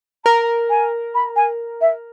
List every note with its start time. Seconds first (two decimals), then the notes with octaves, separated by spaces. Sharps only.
0.25 A#4 A#5
0.70 G#5
1.14 B5
1.36 G#5
1.81 E5